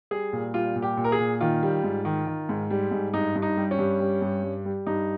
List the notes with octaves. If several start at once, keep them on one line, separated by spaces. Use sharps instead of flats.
G3 G#4
A#2
G3 F4
A#2
G4
A#2
A#4
G#4
A#2
D#3 F4
G3
G#2
D#3
D#3
G#2
G3
G#2
G2 D#4
G2
D#4
G3
C#4
G2
G3
G2
G3
G3
G2 D#4